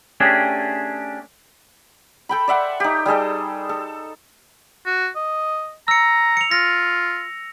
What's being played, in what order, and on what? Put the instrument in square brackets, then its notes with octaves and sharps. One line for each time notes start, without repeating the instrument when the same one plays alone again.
[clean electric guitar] A3 C#4 D4 G4 G#4
[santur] A4 G5 B5
D5 E5 F#5 C6
D#4 G4
G3 G#4 A4 D#5
A4
[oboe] F#4
D#5
[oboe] A#5 [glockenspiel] E6 C#7
[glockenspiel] C#7 F7
[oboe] F4 [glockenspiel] A#6